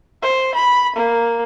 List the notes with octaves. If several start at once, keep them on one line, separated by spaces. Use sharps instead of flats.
C5
B5
A#3